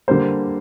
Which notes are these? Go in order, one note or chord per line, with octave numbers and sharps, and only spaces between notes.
D3 G3 A#3 C5